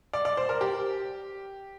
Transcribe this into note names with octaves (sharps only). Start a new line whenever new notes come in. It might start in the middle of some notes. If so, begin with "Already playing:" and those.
D5
D5
C5
A#4
G4